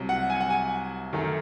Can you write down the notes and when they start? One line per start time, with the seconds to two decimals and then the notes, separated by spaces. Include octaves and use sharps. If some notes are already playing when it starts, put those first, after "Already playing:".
Already playing: C2 C3 F#3
0.09 F#5
0.30 G#5
0.41 F#5
0.50 G#5
1.13 F#2 D#3 A3